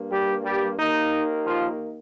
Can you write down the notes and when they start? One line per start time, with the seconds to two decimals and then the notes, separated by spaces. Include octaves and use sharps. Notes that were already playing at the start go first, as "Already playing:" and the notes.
Already playing: G2 A#3
0.10 G3 G4
0.44 G3 G4
0.77 D#2 D#3 A#3 D#4
1.44 F3 F4